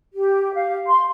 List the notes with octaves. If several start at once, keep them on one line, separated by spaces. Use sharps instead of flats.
G4
F5
C6